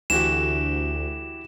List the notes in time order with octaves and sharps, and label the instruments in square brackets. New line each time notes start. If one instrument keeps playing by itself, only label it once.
[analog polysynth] D2 [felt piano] E3 F#4 G4 [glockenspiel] E7